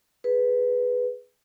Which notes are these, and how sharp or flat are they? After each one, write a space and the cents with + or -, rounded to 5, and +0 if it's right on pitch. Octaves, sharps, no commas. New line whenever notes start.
G#4 +0 B4 +0